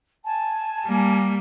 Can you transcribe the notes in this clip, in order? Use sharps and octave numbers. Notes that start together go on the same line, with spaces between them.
G#5 A5
G3 A#3